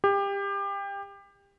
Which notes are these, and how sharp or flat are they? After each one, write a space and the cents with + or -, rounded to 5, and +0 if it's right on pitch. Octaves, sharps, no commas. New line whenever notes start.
G4 +25